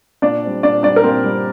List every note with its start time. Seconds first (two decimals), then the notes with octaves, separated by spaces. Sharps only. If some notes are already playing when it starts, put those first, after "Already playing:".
0.22 A#2 D4 D5
0.42 G3 C4
0.63 A#2 D4 D5
0.83 G3 C4 D4 D5
0.96 A#4
1.04 A#2 C4 C5
1.24 G3 C4